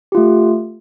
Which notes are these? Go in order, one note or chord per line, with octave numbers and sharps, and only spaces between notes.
A3 F4 G4